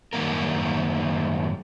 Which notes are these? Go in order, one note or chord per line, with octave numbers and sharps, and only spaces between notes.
F#2 D#3 G3 A#3 A#4